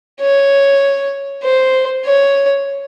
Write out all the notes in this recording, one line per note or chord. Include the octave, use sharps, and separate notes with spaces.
C#5
C5
C#5